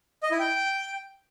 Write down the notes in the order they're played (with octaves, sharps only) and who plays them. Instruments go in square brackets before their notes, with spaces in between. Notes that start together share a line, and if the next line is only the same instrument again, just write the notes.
[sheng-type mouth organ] D#5
E4
G5